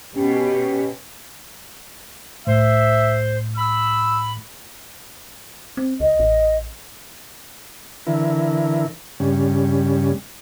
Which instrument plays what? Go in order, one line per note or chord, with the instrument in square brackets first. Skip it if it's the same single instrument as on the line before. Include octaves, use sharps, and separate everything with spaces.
[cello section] B2 [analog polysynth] C#4 [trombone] G4
[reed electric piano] C2 A2 [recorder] C5 [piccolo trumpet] E5
[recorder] B5 [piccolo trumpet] E6
[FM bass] C4
[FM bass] C#2 [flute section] D#5
[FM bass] A1
[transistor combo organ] D3 E3 E4 A#4
G2 C#3 G3 C#4